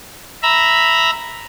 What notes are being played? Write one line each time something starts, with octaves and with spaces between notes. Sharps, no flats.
E5 A#5 B5